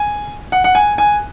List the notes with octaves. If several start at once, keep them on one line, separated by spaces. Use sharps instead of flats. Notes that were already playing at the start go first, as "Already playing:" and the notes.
Already playing: G#5
F#5
F#5
G#5
G#5